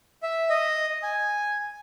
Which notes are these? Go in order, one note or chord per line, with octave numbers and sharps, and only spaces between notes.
E5
D#5
G#5